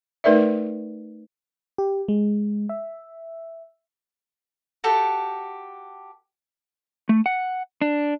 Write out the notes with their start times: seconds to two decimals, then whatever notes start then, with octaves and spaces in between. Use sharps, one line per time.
0.24 A3 D#4 A#4 B4 D5 E5
1.78 G4
2.08 G#3
2.69 E5
4.84 F#4 G4 A4 G5
7.09 A3
7.26 F#5
7.81 D4